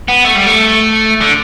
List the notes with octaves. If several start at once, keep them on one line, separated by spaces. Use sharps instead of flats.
B3
A3
G3
A3
D3